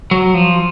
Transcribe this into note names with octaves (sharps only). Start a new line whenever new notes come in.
F#3
F3